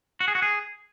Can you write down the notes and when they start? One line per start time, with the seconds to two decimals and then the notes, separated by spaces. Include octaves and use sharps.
0.20 F#4
0.28 G#4
0.35 F#4
0.42 G#4